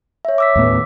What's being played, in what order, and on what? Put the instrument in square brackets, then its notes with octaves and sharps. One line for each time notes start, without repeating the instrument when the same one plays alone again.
[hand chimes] C#5 E5
D6 E6 B6
[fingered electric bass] D#2 A2 B3